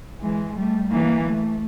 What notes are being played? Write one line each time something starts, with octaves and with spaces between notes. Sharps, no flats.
E3 G#3
G3 A3
E3 A#3
A3